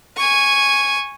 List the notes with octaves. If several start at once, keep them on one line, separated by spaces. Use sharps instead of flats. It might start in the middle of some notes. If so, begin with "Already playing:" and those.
G#5 C#6